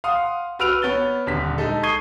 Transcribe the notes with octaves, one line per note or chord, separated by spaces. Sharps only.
F5 F#5 C6 D#6
F#4 B4 E6 F6 D7 F7
B3 C#5 A6 G7
D#1 D3 B6
G#3 D#4 A4
C#6 D#6 G#6 C7 D#7 G7